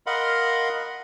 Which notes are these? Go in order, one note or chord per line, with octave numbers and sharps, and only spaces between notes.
A#4 D#5 F5 F#5 B5 C6